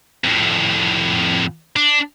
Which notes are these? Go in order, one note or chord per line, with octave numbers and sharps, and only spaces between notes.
F2 A2
D4